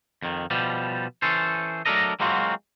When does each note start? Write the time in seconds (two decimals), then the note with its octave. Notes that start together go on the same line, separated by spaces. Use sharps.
0.22 F2 D#3
0.50 B2 F3 G3
1.22 E3 C#4 A4 C5
1.86 F#3 A3 D4 A4 A#4 D#5
2.20 F#3 G#3 A#3 C4 F4 F#4